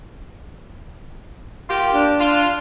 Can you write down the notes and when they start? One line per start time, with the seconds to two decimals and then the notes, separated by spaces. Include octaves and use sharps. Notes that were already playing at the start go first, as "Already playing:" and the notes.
1.69 A#3 F4 G4
1.93 D4
2.19 F4